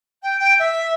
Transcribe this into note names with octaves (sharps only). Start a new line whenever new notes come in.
G5
G5
E5